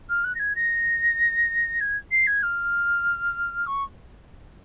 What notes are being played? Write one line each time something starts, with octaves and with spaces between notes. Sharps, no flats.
F6
F#6
A#6
G#6
A#6
G#6
C7
G#6
F6
C#6